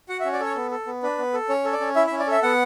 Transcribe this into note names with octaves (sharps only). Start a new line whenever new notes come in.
F#4 F#5
E5
C#4
D5
A4 C#5
B3
A4
B3
D4 B4
B3
A4
C#4 C#5
A4
D5
C#4
E4 E5
E5
C#4
D5
A4 E5
B3 F#5